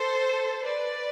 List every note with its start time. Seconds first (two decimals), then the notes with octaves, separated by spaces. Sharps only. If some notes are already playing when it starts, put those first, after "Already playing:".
Already playing: A4 C5
0.64 B4 D5